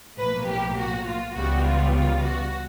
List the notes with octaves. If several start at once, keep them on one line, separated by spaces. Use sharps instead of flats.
B1 A2 F3 A#3 B4
G4
F#4
F4
C#2 C#3 E3 G3 B3 F#4
F4
F4
F#4